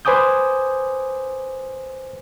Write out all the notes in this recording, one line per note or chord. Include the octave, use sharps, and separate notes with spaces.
B4 C5 G#5 D6 D#6 G6